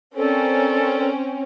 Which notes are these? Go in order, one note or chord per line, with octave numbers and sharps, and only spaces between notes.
C4 C#4 A4 A#4 D5